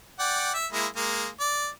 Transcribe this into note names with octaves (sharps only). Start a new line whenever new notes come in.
D5 F#5 G5
E5
G#3 A#3 E4
G#3 A#3
D5